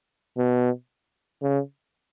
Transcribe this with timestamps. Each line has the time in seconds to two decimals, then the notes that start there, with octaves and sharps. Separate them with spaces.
0.38 B2
1.42 C#3